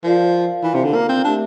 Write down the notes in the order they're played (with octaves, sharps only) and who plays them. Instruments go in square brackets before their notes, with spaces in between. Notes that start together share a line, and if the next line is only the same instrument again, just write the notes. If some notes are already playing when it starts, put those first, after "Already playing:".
[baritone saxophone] F3 [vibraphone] F4 A#4 D5 F5
[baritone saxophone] E3
C3
D3
A#3
C4
[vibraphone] A3 E4 G4 A#4 E5 [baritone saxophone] D4